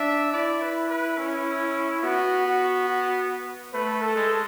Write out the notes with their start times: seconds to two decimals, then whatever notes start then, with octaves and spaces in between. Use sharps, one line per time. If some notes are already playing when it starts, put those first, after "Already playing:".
Already playing: D4 E5
0.33 E4 D5
0.61 B4
0.89 B4
1.18 C#4
2.03 B3 F#4
2.46 F#4
2.88 F#4
3.73 A3 B4
4.02 A4
4.16 G#3